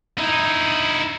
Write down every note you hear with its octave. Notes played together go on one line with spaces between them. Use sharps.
D#4 E4